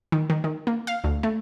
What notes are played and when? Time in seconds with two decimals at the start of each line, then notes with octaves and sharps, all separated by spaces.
0.12 D#3
0.30 D#3
0.44 D#3
0.67 A#3
0.87 F5
1.04 D2
1.23 A3